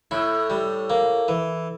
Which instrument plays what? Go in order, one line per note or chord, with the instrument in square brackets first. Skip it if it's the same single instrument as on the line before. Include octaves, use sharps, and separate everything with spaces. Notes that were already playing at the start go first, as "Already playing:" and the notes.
[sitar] A2 [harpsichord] E4
[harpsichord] G3
A#3
E3